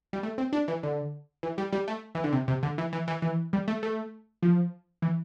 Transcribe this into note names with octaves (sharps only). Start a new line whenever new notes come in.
G3
A3
C4
D4
E3
D3
E3
G3
G3
A3
E3
D3
C3
C3
D3
E3
E3
E3
E3
G3
A3
A3
F3
E3